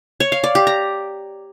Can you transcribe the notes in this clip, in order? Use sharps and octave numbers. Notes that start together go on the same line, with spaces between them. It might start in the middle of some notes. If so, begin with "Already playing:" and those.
C#5
F5
D5
G4
A#5